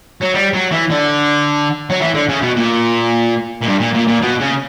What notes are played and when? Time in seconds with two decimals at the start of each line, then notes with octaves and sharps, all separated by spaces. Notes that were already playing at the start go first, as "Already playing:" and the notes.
0.21 F#3
0.34 G3
0.53 F#3
0.71 E3
0.90 D3
1.90 F#3
2.01 E3
2.14 D3
2.29 C#3
2.41 B2
2.56 A#2
3.62 A#2
3.66 G2
3.80 A#2
3.94 A#2
4.08 A#2
4.22 B2
4.40 C#3